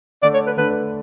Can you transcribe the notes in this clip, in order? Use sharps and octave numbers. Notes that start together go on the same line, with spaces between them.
D3 A3 D4 D5
C#5
B4
D3 A3 D4 B4